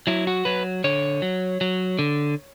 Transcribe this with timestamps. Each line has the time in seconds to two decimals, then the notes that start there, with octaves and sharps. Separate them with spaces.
0.07 F#3 E4
0.27 F#4
0.45 F#3 B4
0.84 D3 C#5
1.22 F#3
1.61 F#3
1.99 D3